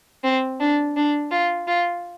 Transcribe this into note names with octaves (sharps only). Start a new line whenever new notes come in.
C4
D4
D4
F4
F4